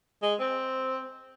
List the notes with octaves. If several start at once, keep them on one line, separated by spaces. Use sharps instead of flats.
G#3
C4